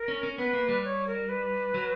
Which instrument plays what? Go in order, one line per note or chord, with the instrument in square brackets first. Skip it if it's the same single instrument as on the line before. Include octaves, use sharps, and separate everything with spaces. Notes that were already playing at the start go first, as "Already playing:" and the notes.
Already playing: [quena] A#4
[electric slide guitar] C#4
C#4
[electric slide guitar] B3 [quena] B4
[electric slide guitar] A#3
G3
[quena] C#5
A#4
B4
[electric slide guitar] F#3